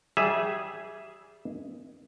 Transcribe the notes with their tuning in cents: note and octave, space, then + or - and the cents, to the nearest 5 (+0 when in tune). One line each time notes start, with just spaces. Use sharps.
G3 -25 G#4 +0 E5 +0